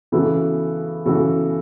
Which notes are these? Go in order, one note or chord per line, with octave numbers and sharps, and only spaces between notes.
C#3 E3 B3 F#4 A4
C#3 E3 B3 F#4 A4